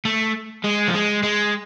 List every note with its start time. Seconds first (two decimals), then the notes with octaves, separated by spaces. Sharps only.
0.05 A3
0.64 G#3
0.88 F3
0.94 G#3
1.23 G#3